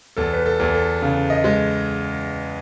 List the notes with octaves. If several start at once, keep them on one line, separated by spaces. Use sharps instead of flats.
E2 A4
B4
A4
E2
A4
C#3
D#5
G#3